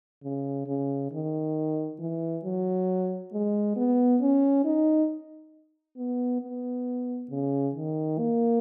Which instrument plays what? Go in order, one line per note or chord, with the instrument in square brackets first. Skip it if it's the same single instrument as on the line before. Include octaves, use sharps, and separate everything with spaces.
[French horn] C#3
C#3
D#3
E3
F#3
G#3
B3
C#4
D#4
B3
B3
C#3
D#3
A#3